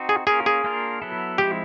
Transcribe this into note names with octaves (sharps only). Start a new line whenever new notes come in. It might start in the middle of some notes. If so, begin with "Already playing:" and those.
Already playing: C4 D#4 F#4
G#4
A#3 C#4 F4 G#4 A#4
G#4
A#3 D4 F4 A#4
F#3 B3 E4 A4
F3 G#3 C4 E4 G4